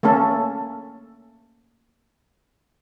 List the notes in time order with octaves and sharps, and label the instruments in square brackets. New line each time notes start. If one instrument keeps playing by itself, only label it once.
[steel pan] A3 A#3 C#4 A4